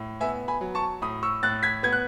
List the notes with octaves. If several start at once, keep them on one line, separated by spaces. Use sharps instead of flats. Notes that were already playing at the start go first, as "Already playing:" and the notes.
Already playing: A2
B3 E5 G#5
G#5 B5
F#3
A5 C#6
A2 B5 D#6
C#6 E6
A2 F#6 A6
G#6 B6
B3 G#6
F#6